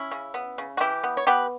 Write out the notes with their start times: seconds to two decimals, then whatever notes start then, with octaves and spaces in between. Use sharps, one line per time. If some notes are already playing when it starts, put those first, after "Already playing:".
Already playing: C#4 E4
0.12 C#3
0.34 B3
0.58 C#3
0.77 F#4
0.80 E3 E4 G4
1.04 B3
1.17 C#5
1.27 B3 G4 B4